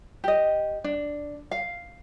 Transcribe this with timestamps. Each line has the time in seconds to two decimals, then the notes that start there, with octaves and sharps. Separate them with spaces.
0.24 G4 D#5
0.84 D4
1.51 F5